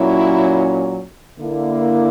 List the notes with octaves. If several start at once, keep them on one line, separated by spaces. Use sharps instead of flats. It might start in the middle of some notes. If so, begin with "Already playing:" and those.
Already playing: A#2 F#3 C#4 E4
D3 A#3 E4